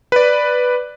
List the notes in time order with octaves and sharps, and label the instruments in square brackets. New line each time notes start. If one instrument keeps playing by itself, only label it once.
[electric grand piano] B4 D5